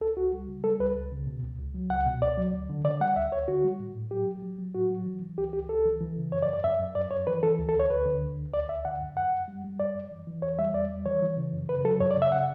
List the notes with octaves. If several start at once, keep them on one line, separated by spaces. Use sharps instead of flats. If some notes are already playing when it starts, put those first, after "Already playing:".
C#2 A4
C#2 F#4
G3
C#3
G3 A4
C#2 B4
C#2
C#3
B2
C#2
C#2
F#3
C#2 F#5
B2
C#2 D5
F#3
D2
D3
D3 D5
G3 F#5
D2 E5
D2 C#5
D3 F#4
G3
A2
A2
F#3 G4
F#3
F#3
F#3
A2 F#4
F#3
E3
E3
C#2 G4
C#2 G4
C#2 A4
E3
E3
C#3
F#2 C#5
D5
F#2
D5
F#2 E5
F#2
F#2 D5
F#2 C#5
E3 B4
E3 A4
D2
A4
D2 C#5
D2 B4
D3
D2
D2
D2 D5
D2 E5
D3 F#5
F#2
F#2 F#5
F#2
G3
G3
F#2 D5
F#2
E3
E3
E2 C#5
G3 E5
E2 D5
G3
E3 C#5
E3
C#3
F#2
C#3 B4
F#3 A4
F#2 C#5
D5
C#3
E5
C#3 F#5